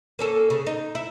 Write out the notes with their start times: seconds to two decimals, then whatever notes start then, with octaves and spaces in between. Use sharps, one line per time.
0.19 A#3 C#4 A4
0.50 C#3
0.66 D#4
0.95 E4